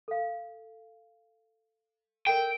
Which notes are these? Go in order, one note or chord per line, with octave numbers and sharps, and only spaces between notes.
A4 F5
A4 A#4 D5 G5